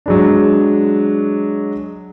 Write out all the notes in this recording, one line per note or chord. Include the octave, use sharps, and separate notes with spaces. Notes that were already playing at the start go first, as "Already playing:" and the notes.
F#3 G#3 D4